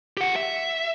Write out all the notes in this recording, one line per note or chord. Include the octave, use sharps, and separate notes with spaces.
G4 F#5
E5